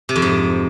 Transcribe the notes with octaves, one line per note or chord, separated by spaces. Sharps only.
C3
F2
G#2